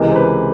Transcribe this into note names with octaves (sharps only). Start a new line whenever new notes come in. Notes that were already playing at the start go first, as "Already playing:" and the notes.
Already playing: C#2 C3 E3 G#3 A#4
C5
B4